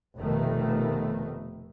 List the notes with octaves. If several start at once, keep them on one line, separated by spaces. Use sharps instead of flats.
F1 B2 D#3 A3